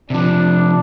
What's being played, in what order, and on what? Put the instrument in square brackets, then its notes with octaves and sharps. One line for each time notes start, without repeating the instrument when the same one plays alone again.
[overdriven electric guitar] C3 F3 [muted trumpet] D4